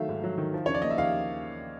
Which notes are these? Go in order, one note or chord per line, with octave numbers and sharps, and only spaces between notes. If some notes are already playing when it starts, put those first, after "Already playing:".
Already playing: D#3 F#3 A3 E5 F5
G#2
F#3
D#3
F3
C#3 C#5
D5
A#3 D#5
E5
D#2 F5